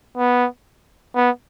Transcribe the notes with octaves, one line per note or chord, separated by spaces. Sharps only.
B3
B3